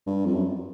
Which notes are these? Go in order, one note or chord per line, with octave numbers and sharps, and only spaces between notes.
G2
F2
F#2